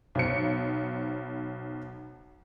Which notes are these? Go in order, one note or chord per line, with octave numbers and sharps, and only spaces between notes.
B1 C5 C#7